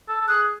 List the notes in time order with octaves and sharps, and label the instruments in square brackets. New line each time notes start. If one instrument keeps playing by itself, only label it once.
[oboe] A4
A4
[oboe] G#4 [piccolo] F#6